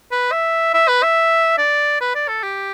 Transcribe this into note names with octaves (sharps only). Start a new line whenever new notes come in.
B4
E5
E5
B4
E5
D5
B4
D5
A4
G4